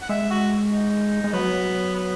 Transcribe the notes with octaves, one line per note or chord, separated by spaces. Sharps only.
F#5
G#3 E5
F#4
D#4
G#3
F#3 B3
B3